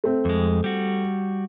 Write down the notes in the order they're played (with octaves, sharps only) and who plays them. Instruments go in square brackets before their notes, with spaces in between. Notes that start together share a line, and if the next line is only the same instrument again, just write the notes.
[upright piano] A3 C4
[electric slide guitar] F2 G#3
G3 F#4